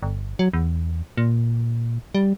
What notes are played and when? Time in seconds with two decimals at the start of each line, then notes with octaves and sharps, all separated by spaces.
0.03 G1
0.39 F#3
0.53 E2
1.17 A#2
2.15 G3